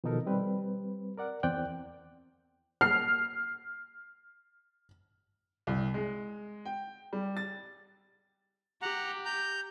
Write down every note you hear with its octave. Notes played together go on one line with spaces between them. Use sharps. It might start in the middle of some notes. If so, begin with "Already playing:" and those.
B2 D#3 F3 D#4 A4 A#4
G3 C4 B4
A#4 D5 F#5
E2 C4 D5 G5 F#6
F6 C7
C2
G#3
G5
G3
A6
G4 F#5 A#5
A#5 G6